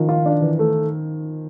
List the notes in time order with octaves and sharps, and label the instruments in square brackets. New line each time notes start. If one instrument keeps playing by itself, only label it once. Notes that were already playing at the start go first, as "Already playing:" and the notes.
Already playing: [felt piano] D#3 F3
[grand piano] F4
D4
E3
A3